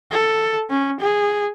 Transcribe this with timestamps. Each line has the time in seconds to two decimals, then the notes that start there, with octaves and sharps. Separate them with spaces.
0.12 A4
0.70 C#4
1.00 G#4